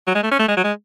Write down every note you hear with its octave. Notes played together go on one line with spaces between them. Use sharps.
F#3
G#3
A3
C#4
A3
G#3
F#3
G#3